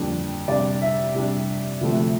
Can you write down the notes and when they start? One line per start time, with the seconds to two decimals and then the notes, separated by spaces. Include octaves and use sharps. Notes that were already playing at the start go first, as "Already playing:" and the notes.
Already playing: F2 D3 G3 A#3 D4
0.48 C3 G3 D4 D5
0.81 E5
1.14 C3 G3 D4
1.81 D2 C3 F3 A3